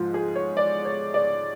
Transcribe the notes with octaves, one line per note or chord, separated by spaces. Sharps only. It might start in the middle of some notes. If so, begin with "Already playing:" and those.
Already playing: G#2 F3 F4
G#4
C#5
D5
C#5
D5